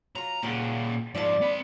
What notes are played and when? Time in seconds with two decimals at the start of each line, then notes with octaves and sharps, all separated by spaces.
0.15 F#3 F4 A#5
0.43 A#2 C#3 G4 F#5
1.15 G#2 F3 D5 A5
1.41 C4 B5